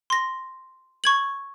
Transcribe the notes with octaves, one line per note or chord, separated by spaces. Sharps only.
C6 A#6
C#6 G#6 F#7